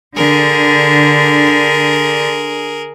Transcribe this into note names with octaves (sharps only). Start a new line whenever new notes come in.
D3 G#4 A#4